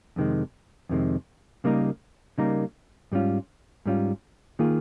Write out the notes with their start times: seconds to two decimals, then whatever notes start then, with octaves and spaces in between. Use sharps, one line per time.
0.16 F2 C3 D#3 G#3
0.89 F2 C3 D#3 G#3
1.64 C#3 G3 A#3 D#4 A#4
2.38 C#3 G3 A#3 D#4 A#4
3.12 G#2 G3 C#4 F4
3.86 G#2 G3 C#4 F4
4.59 D#3 A#3 F4 G#4